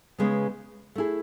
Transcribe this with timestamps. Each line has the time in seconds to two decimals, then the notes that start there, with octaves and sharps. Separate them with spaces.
0.18 C#3 G#3 B3
0.96 A3 E4 G#4